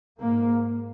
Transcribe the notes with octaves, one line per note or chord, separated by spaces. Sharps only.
G#2 A#3